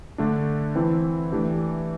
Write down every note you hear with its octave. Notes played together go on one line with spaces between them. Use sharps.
D3 A3 D4
E3 C4 E4
E3 A3 D4 G4